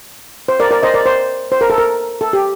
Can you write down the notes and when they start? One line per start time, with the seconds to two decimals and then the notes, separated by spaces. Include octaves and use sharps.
0.48 C5
0.60 A#4 D5
0.71 A#4 D5
0.83 C5 D#5
0.94 A#4 D5
1.06 C5
1.52 C5
1.61 A#4
1.70 A4
1.78 A#4
2.21 A4
2.33 G4